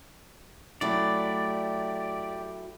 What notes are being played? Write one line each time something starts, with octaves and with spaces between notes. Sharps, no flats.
F#3 A3 E4 G4 D5